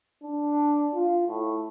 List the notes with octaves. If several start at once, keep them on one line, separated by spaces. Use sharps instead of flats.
D4
F4
A2